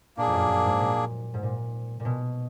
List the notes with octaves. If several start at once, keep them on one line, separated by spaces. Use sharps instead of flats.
A#2 A#3 D4 G#4
F2
F#2
F#2
G#2
A#2
G#2
A#2
A#2
B2